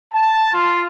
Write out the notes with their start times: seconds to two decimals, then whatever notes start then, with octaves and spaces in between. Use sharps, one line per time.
0.13 A5
0.52 F4